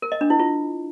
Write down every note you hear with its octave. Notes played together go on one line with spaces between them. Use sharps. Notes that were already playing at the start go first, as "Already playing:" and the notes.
A#4
D#5
D4
E4
F4